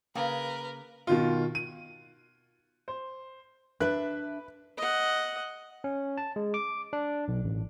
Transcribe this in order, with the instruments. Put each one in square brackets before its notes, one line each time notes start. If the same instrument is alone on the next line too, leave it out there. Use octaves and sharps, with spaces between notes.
[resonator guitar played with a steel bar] C#3 A#3 G5 [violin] A#4 B4
[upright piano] B2 D#3 F4
D#7
C5
[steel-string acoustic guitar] D4 E5 [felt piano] B4 F#6
[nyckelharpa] D#5 F#5
[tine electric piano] C#4
A5
G#3
D6
D4
B1
A1